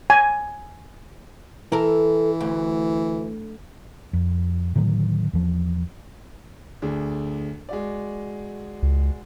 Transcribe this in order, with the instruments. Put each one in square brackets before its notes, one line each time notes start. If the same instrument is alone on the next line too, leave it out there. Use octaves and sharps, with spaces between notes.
[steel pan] G#5
[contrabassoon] E3 [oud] A4 A#4
[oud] D2
[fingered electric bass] F2
A2 D3 D#3 F#3
E2 F3
[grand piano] D2 D4 G#4
G#3 F#4 D5
[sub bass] C#2